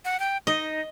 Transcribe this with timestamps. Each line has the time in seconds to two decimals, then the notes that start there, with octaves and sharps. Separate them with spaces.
0.05 F#5
0.20 G5
0.47 D#4 D#5